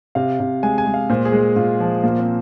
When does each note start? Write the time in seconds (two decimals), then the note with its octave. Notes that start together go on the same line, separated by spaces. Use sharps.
0.15 C3 F5
0.40 C3
0.63 G#3 G#5
0.78 G#5
0.86 G#3
0.94 F5
1.10 A#2 C5
1.25 G#4
1.32 G#3
1.56 A#2 F4
1.80 F3
2.03 A#2 A#3
2.19 C4